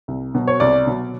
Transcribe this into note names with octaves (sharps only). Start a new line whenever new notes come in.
C2
B2 F#3
C#5
C2 D5
B2 F#3